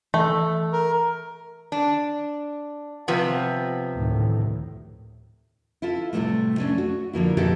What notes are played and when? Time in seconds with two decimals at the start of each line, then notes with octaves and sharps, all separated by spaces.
0.14 E3 A3
0.72 A#4
1.72 D4
3.08 C3 F3 B3
3.95 D2 A2 D#3
5.82 E4 F4 A4
6.13 A2 C3 D#3 F#3 G3 A3
6.58 A3 C#4 D4
6.78 F#4
7.13 D3 F3 A#3 E4
7.37 B2 D#3 E4 F#4 G4 A4